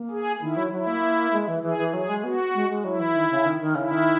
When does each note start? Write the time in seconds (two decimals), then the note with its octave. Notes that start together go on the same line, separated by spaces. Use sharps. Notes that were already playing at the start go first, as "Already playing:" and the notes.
Already playing: A#3
0.11 G#4
0.41 D#3 E4
0.57 F#3
0.72 F#3 E4
0.87 A#3
1.32 G#3
1.48 E3
1.63 E3 G#4
1.78 E3
1.93 F#3 G#4
2.09 G#3
2.24 B3 F#4
2.54 G#3
2.69 G#3
2.84 F#3 E4
3.00 E3
3.15 D#3
3.30 C#3
3.45 D#3
3.61 D#3
3.75 C#3 E4
3.91 D#3